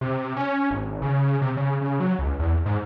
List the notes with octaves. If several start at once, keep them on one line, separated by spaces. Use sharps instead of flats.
C3
C#4
G#1
C#3
C3
C#3
C#3
F#3
C#2
E2
G#2